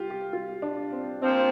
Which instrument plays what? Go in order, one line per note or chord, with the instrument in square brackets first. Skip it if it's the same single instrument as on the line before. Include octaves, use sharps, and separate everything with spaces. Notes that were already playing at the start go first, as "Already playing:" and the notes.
Already playing: [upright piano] F4 G4
G4
F4
D4
C4
[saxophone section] A#2 F3 C4 [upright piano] D4